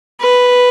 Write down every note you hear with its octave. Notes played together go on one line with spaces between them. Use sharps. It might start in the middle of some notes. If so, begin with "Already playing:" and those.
B4